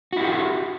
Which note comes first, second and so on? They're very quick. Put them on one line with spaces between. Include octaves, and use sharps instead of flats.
F#4 E4 G4